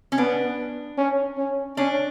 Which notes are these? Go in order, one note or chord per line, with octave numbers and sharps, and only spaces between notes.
C#4
B3 D4
C#4
C#4
C#4 D4